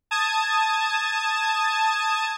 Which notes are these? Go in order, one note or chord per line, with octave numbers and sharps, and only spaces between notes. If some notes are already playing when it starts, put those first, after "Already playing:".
A5 D#6 G#6